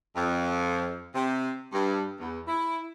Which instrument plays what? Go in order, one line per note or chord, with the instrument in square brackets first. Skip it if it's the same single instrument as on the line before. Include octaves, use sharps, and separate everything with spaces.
[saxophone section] F2
C3
G2
E2
E4